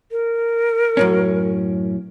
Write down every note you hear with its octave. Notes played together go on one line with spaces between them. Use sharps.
A#4
F#2 A2 C#4